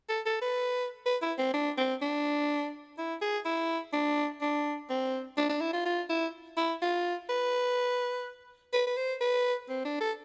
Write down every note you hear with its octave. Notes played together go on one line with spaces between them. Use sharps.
A4
A4
B4
B4
E4
C4
D4
C4
D4
E4
G#4
E4
D4
D4
C4
D4
D4
E4
F4
F4
E4
E4
F4
B4
B4
B4
C5
B4
C4
D4
A4